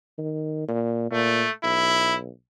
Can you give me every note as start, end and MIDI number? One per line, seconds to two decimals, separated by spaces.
0.18 0.67 51
0.68 1.09 46
1.12 1.45 46
1.12 1.51 57
1.64 2.29 35
1.64 2.15 64